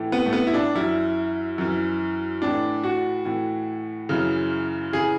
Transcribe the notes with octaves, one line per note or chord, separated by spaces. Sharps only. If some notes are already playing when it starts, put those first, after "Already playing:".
Already playing: A2 E3
B3
A3
B3
E4
D4
F#2 E3 E4
F#2 E3
A2 E3 D4
F#4
A2 E3
F#2 C#3 E3
C#3 E3 G#4